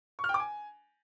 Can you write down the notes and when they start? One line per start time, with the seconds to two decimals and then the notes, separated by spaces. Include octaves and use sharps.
0.19 C#6
0.24 F6
0.29 G5
0.34 D6
0.39 G#5